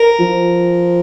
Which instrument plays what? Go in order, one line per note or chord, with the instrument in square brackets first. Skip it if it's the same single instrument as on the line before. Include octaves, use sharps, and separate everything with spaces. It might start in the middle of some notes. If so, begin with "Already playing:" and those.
Already playing: [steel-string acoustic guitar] A#4
[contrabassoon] F3